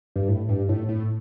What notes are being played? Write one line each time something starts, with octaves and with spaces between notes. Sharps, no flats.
G2
A2
G2
A2
A2